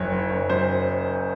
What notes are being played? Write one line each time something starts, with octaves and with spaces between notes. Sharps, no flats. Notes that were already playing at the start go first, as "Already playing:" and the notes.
Already playing: F#1 F#2 C#5
F#1
F#1
F#2 C5